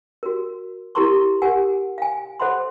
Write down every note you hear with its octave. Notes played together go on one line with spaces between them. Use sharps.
F#4 A#4
E4 G4 A#4 A#5 C6 C#6
G4 A#4 F#5 G#5
F5 G#5
A4 C5 E5 F#5 B5 C6